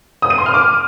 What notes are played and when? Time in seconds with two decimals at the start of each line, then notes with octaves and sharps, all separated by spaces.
0.22 D#6
0.30 D#7
0.38 C6
0.46 F6
0.54 D6